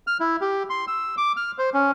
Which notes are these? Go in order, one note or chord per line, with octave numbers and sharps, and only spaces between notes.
F6
E4
G4
C6
E6
D6
F6
C5
C#4